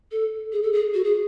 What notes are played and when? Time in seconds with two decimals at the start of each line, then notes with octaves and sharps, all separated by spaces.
0.12 A4
0.52 G#4
0.63 A4
0.73 G#4
0.94 F#4
1.04 G#4